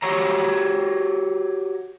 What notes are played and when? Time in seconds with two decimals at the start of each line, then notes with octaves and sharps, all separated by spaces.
0.03 F#4 G4 C#5 A#5